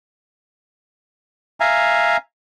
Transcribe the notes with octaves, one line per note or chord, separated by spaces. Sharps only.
E5 F5 G#5 A#5